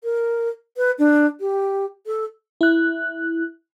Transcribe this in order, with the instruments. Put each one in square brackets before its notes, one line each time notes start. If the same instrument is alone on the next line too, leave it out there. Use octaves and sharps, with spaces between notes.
[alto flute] A#4
B4
D4
G4
A4
[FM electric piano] E4 F#6